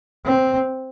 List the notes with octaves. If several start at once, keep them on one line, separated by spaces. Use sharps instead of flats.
C4